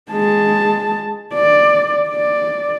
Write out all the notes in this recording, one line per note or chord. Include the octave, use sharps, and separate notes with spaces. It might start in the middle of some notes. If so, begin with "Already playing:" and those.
G#3 A5
D5
D5